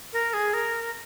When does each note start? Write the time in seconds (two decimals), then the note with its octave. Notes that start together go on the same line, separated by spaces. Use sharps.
0.13 A#4
0.33 G#4
0.54 A#4